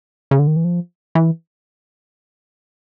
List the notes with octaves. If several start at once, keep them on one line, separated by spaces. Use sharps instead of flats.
C#3
D3
D#3
E3
F3
E3